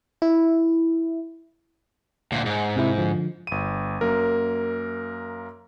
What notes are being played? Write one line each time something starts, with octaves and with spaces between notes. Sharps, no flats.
E4
D2 A#2
G#2
C3 E4
D3 F3
G1 D#7
F#2 A#3 A#4